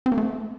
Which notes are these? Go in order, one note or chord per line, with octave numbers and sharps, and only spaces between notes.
C4
A#3
A3